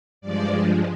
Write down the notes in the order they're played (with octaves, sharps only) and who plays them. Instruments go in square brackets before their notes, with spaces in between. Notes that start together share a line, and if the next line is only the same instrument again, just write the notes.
[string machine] G2 F3 G#3 D5